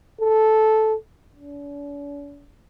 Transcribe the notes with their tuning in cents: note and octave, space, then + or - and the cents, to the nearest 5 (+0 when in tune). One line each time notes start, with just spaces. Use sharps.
A4 -10
D4 -45